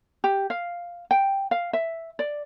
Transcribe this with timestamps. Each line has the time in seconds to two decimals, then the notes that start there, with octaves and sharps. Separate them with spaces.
0.24 G4
0.50 F5
1.11 G5
1.51 F5
1.73 E5
2.19 D5